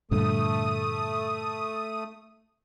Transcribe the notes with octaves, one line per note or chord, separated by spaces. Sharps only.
G2 A#2 D3 A3 D#6